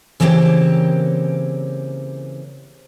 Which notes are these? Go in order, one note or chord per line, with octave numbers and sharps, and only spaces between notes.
C#3 E3 A#3 C4 G4 C#5